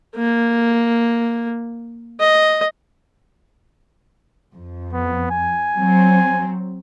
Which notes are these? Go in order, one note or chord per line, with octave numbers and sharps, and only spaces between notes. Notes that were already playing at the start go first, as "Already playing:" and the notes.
A#3
D#5
F2
B3
G#5
F#3 C4